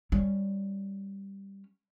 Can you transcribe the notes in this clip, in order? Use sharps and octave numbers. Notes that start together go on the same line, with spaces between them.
G3 C#4